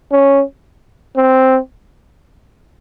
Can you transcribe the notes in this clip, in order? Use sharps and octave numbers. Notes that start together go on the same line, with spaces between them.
C#4
C4